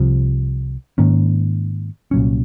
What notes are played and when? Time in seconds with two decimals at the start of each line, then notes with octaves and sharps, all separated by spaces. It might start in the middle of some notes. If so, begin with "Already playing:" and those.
Already playing: C2 C3 F3
0.98 G#2 D#3 A#3 C#4
2.11 C2 A#2 F#3 C#4